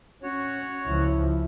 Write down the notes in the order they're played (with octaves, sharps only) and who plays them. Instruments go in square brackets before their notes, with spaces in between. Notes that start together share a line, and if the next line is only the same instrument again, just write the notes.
[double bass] C#4 [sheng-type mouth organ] F#4 C#5
[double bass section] C#2 F3 [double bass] E4